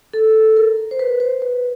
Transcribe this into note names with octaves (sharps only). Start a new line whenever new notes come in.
A4
A#4
C5
B4
C5
B4